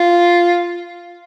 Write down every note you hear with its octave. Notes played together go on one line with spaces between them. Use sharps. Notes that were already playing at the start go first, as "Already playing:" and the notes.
Already playing: F4